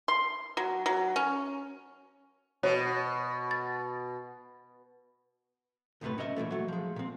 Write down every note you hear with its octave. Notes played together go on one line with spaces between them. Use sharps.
C6
F#3
F#3
C#4
B2 C#5
A6
C#2 F#2 A2 C3 A3 B4
C#4 A#4 D#5 E5
A#2 C#3 E3 A3
F#3 A3
F3 G#3
A#2 C4